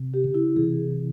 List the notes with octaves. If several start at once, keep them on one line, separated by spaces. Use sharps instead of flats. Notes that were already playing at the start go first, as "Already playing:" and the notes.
Already playing: C3
G4
C#3
E4
C3 E3 G#4